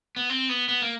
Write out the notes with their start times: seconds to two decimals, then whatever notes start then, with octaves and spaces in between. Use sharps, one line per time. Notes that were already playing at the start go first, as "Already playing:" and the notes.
0.16 B3
0.30 C4
0.49 B3
0.69 B3
0.82 A#3